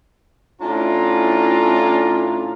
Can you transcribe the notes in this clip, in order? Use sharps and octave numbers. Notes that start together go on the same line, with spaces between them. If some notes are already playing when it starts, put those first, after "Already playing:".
A2 C#4 D4 E4 F4 A#5